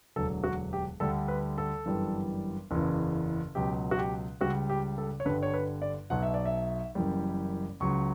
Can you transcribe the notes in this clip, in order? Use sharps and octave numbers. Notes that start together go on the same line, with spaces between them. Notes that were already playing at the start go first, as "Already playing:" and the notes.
E1 D2 D3 F#3 A4
F#4
G4
D2 D3 G3 A4
B4
A4
G1 F#2 E3 G3
F#1 E2 C#3 E3
C#2 B2 F#3 G4
F#4
G4
C#2 C#3 G3 F#4
G4
A4
C#5
G1 G2 D3 G3 B4
C#5
B4
D5
B1 B2 F#3 F#5
E5
D5
E5
F#1 F#2 E3 G3
C#2 C#3 F#3 C#6